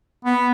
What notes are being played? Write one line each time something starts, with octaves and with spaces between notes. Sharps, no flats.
B3